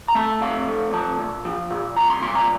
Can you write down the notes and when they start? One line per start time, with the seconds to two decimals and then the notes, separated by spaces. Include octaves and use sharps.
0.08 A#5
0.15 A3 A5
0.41 F2 F5
0.68 A3
0.93 F3 A5
1.19 A#2
1.45 F3
1.70 A#2
1.96 C2 A#5
2.10 C6
2.22 A#2 C6
2.35 A#5